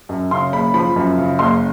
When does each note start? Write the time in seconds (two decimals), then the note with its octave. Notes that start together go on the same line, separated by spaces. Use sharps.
0.09 F#2
0.31 C#3 C6
0.53 F#1 B5
0.74 F3 B5
0.96 F#2
1.18 C#3
1.39 F#1 C6